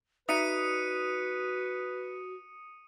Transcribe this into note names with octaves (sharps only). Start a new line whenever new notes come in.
D#4 F#4 B4 D5 E5 D#6 C#7 D#7